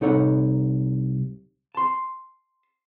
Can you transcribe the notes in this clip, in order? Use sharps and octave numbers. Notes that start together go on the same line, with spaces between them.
C2 D#4 A4 C#5 F#5
A5 C6